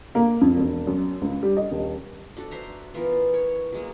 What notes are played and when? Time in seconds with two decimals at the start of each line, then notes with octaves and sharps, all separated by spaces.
0.15 A#3
0.41 F2
0.56 E1
0.87 F#2
1.21 C#2
1.43 G3
1.57 D#5
1.71 D#1
2.37 D4 F#4 A4
2.51 C5 E5 A#5
2.94 E3 B3 F4 A#4
3.34 C#5
3.72 F#3 G#3 A#3